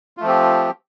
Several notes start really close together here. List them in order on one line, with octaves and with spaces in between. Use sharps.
F4 A3 F3 C4 G4